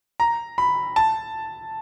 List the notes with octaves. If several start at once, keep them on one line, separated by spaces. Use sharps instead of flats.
A#5
B5
A5